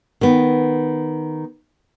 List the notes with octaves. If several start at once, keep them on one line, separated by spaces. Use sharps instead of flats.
D#3 B3